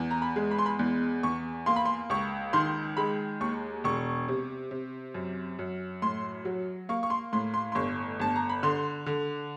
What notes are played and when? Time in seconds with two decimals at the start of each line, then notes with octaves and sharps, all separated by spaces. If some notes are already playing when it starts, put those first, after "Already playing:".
Already playing: E2
0.11 A#5
0.22 B5
0.36 G#3
0.51 B5
0.59 C6
0.66 B5
0.79 E2
1.23 E2 C#6
1.66 A#3 C6
1.76 B5
1.85 C6
2.10 C#2 C#6
2.53 D#3 C6
2.97 G#3 B5
3.41 D#2 C#6
3.84 E1 C#6
4.28 C3
4.71 C3
5.14 F#2
5.59 F#2
6.02 A2 C6
6.45 F#3
6.89 A#3 C#6
7.03 C#6
7.10 C6
7.33 A2 C6
7.54 C6
7.72 C6
7.75 G1 C#6
8.20 G1 A5
8.36 A#5
8.49 B5
8.63 D3 C6
9.06 D3